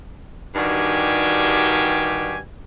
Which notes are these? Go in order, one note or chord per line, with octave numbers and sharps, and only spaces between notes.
G2 D#3 D4 F#4 G4 G#5